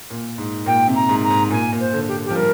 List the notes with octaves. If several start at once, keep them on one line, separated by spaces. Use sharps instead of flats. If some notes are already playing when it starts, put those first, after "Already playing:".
A#2
G#2
A#2 G5
C3
A#5
G#2
A#5
G#2
A#2 G#5
A#2
C5
D3
G4
G4
F3
G3 A#4